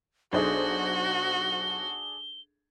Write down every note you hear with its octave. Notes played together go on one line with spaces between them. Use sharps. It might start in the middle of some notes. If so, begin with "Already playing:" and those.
B1 D4 D#4 F#4 G#4 A4 C5 G7